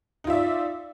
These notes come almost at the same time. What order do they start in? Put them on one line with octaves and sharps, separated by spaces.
D#4 F4 E5 D5